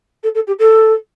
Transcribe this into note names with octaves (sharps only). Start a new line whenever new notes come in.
A4
A4
G4
A4